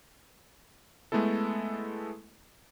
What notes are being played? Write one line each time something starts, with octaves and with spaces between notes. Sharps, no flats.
G#3 A3 B3 E4 A4